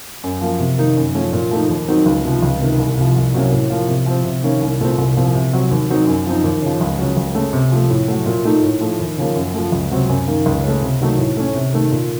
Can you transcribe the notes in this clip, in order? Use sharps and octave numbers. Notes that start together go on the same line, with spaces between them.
F#2
F3 A#3
C3
D#3 A#3 D#4
F#2
F3 A3 C#4
A#2
F3 A3 D#4
D#2
D#3 F#3 C4 D#4
C#2
C3 F3
C#2
C3 D#3
C2
C3 F3
C2
C3 F#3 A#3 C#4
A2
F3 A#3
C3
F3 C4
C3
D#3 A#3 C#4
C2
A#2 A3 C4
C2
A#2 F3 C4
C3
F#3 C4
D#2
D#3 F#3 C4 D#4
F#2
F3 C4 D#4
D#2
C#3 F3
C#2
C#3 F#3
C#2
C#3 A3
C3
F3 A3
A2
F#3 A3
A#2
A3 D#4
A2
F3 A3
D#2
C#3 F3 A#3
F#2
F3 A3
C#2
C3 F#3 C4
F#2
D#3 A#3
C#2
C#3 A3
C3
D#3 F#3 A3 D#4
A2
A3 C#4
C3
D#3 A3
A#2